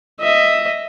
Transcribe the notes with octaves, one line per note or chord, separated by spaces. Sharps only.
D#5 E5